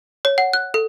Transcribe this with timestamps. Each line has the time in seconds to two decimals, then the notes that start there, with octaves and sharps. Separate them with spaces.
0.25 C#5
0.38 F#5
0.53 F#6
0.74 A4